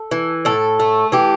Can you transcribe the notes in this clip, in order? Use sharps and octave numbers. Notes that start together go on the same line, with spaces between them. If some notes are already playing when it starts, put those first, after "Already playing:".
Already playing: A4
E3
A2 A4
A3
E3 G4